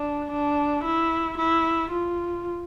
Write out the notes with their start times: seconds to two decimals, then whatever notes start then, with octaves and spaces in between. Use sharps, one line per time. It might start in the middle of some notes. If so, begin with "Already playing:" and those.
Already playing: D4
0.31 D4
0.84 E4
1.38 E4
1.91 F4